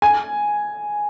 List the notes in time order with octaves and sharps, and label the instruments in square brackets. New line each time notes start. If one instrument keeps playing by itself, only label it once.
[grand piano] G#5